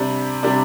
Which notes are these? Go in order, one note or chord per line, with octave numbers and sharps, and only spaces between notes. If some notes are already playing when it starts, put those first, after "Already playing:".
Already playing: C3 G3 D4
C3 G3 D4